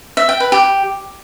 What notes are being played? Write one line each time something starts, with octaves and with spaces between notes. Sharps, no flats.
E5
G5
B4
G4